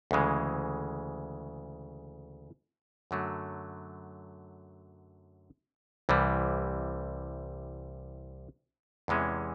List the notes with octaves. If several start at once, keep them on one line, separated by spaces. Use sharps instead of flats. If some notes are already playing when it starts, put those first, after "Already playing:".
D2 C#3 E3 G#3
F#2 D3 F#3 A3
C2 C3 E3 G3
E2 C3 E3 G#3 C#4